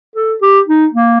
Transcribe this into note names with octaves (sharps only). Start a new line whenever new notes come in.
A4
G4
D#4
A#3